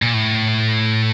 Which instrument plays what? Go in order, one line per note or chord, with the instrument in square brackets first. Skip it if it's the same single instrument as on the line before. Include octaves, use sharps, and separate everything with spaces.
[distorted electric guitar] A#2
A2